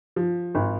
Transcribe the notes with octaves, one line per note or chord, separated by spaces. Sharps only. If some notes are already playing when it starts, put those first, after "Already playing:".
F3
G#1